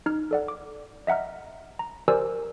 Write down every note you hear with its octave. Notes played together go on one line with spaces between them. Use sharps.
D#4 F6
A4 D5 F#5
D6
D#5 E5 F#5 A#5 F6
A#5
G4 A#4 C5 D5 G#5 E6